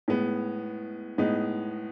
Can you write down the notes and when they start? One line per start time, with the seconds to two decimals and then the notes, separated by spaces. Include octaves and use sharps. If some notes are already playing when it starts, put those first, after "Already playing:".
0.08 A2 G#3 B3
1.18 A2 G#3 B3 D#4